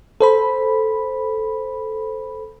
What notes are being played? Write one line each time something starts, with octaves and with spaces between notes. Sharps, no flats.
A4 C5 B5